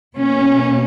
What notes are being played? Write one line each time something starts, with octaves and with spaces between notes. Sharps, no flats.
B2 A#3 C#4